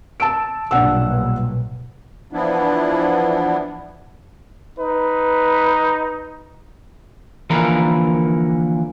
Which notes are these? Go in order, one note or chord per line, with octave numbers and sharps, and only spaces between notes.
A5 E6 D7
B1 G2 A#2 D4 F#5 E6
E3 F3 B3 D4 E4
D#4 B4
D3 E3 F3 A#3 A#4 B4